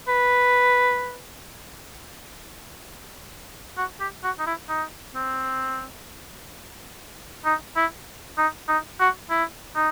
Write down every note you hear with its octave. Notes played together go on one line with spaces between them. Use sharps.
B4
F#4
G4
F#4
D#4
E4
D#4
C4
D#4
E4
D#4
D#4
F#4
E4
D#4